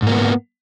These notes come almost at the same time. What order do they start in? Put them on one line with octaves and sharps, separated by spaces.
G#2 A#3 B3